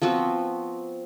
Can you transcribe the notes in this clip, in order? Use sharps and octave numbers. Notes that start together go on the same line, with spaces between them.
F3 B3 C4 F#4